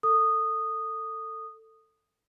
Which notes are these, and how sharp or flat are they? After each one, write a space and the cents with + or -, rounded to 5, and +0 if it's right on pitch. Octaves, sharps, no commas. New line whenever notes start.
A4 +20 D#6 -10